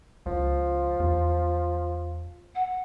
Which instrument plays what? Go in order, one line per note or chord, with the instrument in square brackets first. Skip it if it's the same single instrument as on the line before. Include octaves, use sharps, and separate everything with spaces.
[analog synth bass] C#2 [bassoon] F3
[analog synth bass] E2
[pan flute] F#5